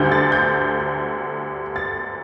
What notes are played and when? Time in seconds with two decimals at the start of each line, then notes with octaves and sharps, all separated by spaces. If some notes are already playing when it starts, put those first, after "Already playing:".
Already playing: D2 D3 G3 G6
0.12 A6
0.32 G6
1.76 A6